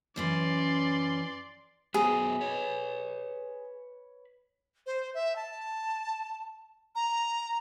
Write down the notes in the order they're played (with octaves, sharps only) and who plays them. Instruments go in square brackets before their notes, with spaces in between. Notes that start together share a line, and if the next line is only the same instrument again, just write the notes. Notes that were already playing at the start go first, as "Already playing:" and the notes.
[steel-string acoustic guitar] F#2 E3 C#4 [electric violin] D5 C6
[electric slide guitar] F#3 B3 C5 [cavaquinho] G#4
[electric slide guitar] B4 C#5
[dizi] C5
E5
A5
A#5